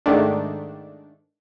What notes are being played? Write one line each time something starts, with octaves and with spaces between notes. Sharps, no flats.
G#2 D#3 A3 D4